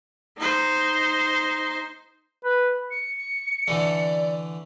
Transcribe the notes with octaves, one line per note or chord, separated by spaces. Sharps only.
D#4 C5
B4
C#7
D3 E3 A3 D5